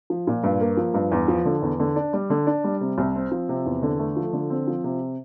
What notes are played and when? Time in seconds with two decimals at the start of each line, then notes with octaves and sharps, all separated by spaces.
0.10 F3
0.27 A#2
0.44 G2
0.61 A#3
0.77 F3
0.94 G2
1.11 E2
1.28 F3
1.45 D3
1.62 E2
1.80 D3
1.96 D4
2.13 G3
2.30 D3
2.47 D4
2.64 G3
2.81 C3
2.98 C2
3.15 C4
3.32 F3
3.49 C3
3.66 E2
3.83 D3
3.99 A3
4.16 F3
4.33 D3
4.50 C4
4.67 F3
4.84 C3